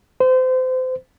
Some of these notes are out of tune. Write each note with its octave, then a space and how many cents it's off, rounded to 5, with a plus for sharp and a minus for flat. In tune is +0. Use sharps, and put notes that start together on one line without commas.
C5 -30